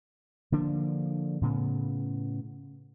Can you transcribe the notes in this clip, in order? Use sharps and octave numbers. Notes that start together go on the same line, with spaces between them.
D3 F3 A#3 D4
A2 C#3 B3